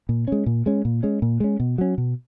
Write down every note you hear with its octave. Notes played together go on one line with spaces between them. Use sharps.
A#2
G#3 C#4
A#2
G#3 C#4
A#2
G#3 C#4
A#2
G#3 C#4
B2
F#3 C#4
B2